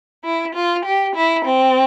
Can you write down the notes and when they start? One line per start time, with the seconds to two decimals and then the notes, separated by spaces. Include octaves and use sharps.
0.24 E4
0.55 F4
0.85 G4
1.15 E4
1.45 C4